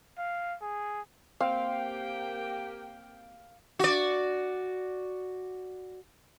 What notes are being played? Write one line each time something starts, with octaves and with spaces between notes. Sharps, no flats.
F5
G#4
A#3 C4 G4 F5 G5
F#4 D5